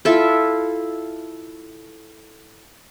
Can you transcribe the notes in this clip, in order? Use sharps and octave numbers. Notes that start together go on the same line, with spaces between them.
E4 F4 A4 E5